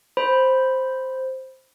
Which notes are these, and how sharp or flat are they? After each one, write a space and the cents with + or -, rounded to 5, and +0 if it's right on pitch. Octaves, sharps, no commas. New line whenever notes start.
C5 +0 B5 +0